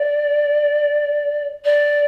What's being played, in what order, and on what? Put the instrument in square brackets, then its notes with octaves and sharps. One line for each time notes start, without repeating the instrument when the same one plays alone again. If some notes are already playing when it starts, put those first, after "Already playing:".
Already playing: [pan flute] D5
D5